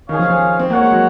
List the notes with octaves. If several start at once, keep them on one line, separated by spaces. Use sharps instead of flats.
D#3 C#4 G#4 C#5 F5
F3
F3
C4
A#3 F#4 C#5 F#5
G#3
F#3